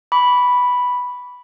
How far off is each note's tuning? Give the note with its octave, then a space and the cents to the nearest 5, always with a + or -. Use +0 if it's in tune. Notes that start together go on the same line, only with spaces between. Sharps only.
B5 +0 D6 -40